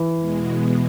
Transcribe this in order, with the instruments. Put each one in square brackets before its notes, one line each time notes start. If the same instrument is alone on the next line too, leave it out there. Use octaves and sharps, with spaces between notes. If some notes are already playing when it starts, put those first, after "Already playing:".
Already playing: [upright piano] E3
[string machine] E2 B2 G#3